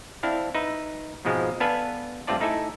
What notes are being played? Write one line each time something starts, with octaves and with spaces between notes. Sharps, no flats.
C4 D4 E4 F5
D#4 B4 E5
G#2 B2 F3 G#3 C4
B3 D4 A4 B4 F5 G#5
G2 A3 C4 F4 D5 A5
A3 D#4 E4 A4 G#5